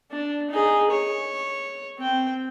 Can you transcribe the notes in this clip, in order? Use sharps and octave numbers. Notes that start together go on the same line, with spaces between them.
D4
D#4 G#4
C#5
C4 G5